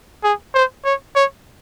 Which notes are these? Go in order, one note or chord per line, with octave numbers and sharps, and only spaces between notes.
G#4
C5
C#5
C#5